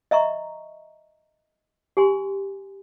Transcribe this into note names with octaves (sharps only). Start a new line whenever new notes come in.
D#5 E5 A#5 C#6
G4 G#5 C6